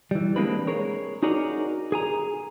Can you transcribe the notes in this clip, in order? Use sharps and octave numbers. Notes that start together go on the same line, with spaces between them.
E3 G3
E3 G#3 A#3 C4 D4 B4
G#4 A#4 C#5
D#4 F#4 G#4 A#4 C#5 D5
G#4 G#5 A#5